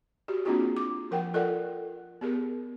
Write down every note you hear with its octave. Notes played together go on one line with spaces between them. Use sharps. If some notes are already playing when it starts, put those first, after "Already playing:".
F#4 G4
A#3 C4 D4 F4 F#4 G#4
D6
F3 A#4 F#5 G5
F4 A4 A#4 D5 F#5
B3 G4 G#4 A#4